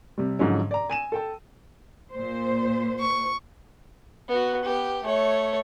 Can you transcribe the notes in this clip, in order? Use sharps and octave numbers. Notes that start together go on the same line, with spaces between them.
C3 G3
G#2 D3 F3 F#3 C#4
D5 A#5
G#5 D#7 E7
A4 G5 A5
A#2 C5
C#6
B3 F#4
B3 G4
A3 C#5